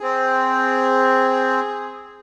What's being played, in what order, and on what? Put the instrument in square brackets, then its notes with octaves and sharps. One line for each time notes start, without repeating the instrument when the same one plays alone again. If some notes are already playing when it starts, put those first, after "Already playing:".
[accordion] C4 [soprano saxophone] G#4